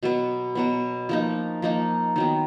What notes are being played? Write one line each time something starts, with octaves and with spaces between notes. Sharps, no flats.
B2 F#3 B3
B2 F#3 B3
F3 A#3 D#4
F3 A#3 D#4
D#3 F#3 B3